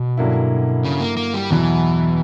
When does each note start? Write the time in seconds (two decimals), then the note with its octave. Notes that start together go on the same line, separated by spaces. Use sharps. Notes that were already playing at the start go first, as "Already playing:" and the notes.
Already playing: B2
0.17 G2 D3 F#3 A#3 E4
0.84 C#3
1.01 A#3
1.17 A#3
1.34 G3
1.50 E2 B2 E3 F#3